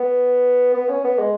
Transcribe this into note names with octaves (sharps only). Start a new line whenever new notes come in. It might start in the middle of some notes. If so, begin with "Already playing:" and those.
Already playing: B3
B3
C#4
B3
G#3